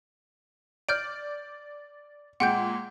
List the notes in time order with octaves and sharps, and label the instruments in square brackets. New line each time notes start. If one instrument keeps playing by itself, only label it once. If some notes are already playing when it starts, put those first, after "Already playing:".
[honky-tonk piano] D5 [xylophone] F6 G6 D7
[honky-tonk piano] A#2 G#3 [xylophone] F#5 G5 G6